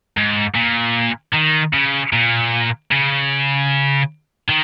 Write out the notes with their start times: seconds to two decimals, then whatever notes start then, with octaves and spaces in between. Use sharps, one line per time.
0.17 G#2
0.55 A#2
1.33 D#3
1.74 C#3
2.13 A#2
2.92 C#3
4.49 D#3